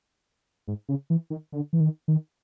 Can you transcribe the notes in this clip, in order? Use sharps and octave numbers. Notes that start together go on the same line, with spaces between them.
G#2
C#3
E3
D#3
D3
E3
D#3
D#3